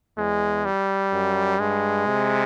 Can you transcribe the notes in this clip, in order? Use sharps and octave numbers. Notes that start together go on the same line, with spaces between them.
E2 G#3
G3
F#2
G2 G#3
C3